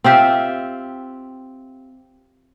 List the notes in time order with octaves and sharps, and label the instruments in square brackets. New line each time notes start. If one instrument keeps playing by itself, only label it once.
[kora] C4 F4 G4 E5